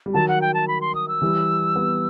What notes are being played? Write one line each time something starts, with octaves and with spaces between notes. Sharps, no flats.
G3
D#3 F#3 A5
F#5
G5
A5
B5
C6
D#6
E6
E3 G3
G3 B3